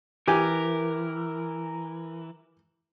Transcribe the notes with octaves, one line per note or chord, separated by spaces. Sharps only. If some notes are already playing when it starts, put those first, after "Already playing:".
E3 G4 A#4 G#5